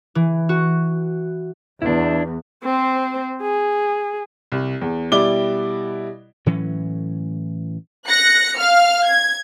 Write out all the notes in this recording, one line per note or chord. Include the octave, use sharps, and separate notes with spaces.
E3
F#4
E2 D4 E4
C4 C5
G#4
C2
E2
B2 G3 E4 D5 D6 G7
A2 E3 F#3 C#4
F#6 A#6 C#7
F5 F6
G#6